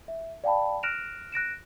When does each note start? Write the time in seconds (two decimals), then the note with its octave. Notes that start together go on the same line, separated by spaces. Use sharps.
0.08 E5
0.44 D5 F5 G5 A5 B5
0.83 F6 F#6 A#6 D7 E7 F7
1.32 F#6 A#6 D7 E7